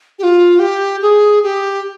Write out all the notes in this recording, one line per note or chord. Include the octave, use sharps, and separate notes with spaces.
G4
F4
G4
G#4
G4